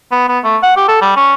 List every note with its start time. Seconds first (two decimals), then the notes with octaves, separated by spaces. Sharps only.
0.12 B3
0.28 B3
0.44 A3
0.63 F#5
0.77 G4
0.88 A4
1.02 G3
1.16 C#4